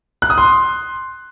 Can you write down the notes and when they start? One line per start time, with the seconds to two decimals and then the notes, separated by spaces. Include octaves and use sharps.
0.22 F#6
0.30 D#6
0.38 C6